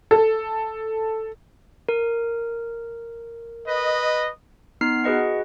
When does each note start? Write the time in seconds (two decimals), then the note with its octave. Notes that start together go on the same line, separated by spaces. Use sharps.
0.11 A4
1.89 A#4
3.68 B4 D#5
4.81 B3 D#4 F6 C7
5.04 F#4 G#4 B4 D#5 F#5